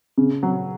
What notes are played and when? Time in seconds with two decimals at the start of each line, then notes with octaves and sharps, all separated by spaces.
0.18 C#3
0.43 F#3